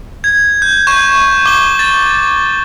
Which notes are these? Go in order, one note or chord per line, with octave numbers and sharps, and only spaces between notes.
G#6
G6
C#6 G6 G#6 E7
D6 G7
A6